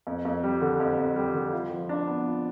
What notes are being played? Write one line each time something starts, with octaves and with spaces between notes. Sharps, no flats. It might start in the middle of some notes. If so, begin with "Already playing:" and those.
F2
F2
G3
D3
F2
F2
G3
D3
F4
F3
D4
B3
F4